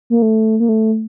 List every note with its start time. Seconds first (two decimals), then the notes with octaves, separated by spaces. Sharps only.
0.10 A#3
0.22 A3
0.60 A#3
0.69 A3